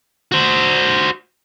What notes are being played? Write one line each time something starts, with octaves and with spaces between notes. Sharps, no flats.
F#4 C5